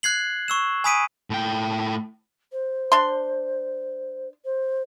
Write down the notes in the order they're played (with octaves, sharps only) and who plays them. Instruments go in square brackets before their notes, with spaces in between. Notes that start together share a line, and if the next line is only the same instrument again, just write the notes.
[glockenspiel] F#6 G#6 C7 F#7
C#6 E6 E7
G#5 B5 D#6 B6 D7 D#7
[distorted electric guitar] A2 G5
[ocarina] C5
[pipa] D4 C6
[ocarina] C5